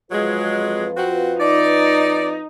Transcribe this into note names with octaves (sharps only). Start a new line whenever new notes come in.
F2 F#3 G#3 F4 B4
C4 F#4
D#4 D5